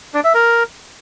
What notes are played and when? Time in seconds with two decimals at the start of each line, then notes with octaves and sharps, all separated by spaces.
0.14 D4
0.24 E5
0.34 A#4